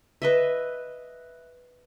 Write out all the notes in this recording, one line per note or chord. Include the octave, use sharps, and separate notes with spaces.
B4 D#5 E5